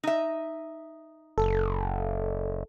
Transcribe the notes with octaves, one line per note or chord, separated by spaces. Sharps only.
D#4 E5
F#1 A4